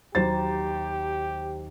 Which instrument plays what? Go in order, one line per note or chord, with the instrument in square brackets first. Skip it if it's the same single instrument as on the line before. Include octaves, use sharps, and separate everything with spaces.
[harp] D#2 A#5 [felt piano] F#3 C5 A6 [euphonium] G4